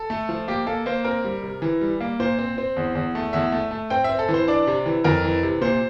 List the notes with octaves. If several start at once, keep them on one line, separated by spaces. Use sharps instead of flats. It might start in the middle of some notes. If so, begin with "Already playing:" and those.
Already playing: A4
A3
F3
A#3 G4
A#3 A4
A#3 C5
C4 A#4
G3
C3
E3
G3
A#3
A#2 C5
C4
C4
E2
E2
A3
E2 E5
A3
A3
C4 G5
C4 E5
A4
E3
C5
D4 D5
C3
E3
F2 A#4
E3
C3
A#2 C5